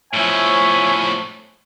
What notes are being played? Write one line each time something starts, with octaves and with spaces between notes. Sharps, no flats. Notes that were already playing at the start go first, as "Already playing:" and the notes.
A2 F3 C#5 E5 G#5